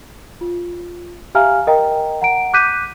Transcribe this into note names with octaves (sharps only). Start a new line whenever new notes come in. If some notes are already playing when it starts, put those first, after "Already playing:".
F4
G4 E5 F5 G#5 A#5 F6
A#4 D#5 G5 A#5
F#5 A#5 D7
D6 F#6 G6 B6 D#7